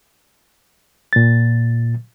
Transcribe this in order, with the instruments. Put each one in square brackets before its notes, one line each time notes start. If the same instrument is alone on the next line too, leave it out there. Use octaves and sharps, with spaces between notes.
[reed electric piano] A#2 A6